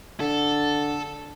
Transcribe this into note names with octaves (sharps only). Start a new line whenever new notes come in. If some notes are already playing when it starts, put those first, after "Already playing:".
D3 A4